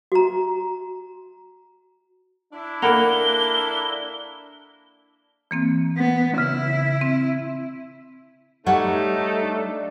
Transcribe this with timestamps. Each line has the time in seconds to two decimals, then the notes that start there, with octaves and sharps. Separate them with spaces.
0.12 F#4 A#5
2.53 D4 E4
2.82 A#3 A4 F#5 B5 F7 G7
5.51 E3 A#3 C4
5.97 B3
6.38 C#3 E4
7.01 C4
8.66 G3 A3 D#4 C#5 F#5
9.43 D4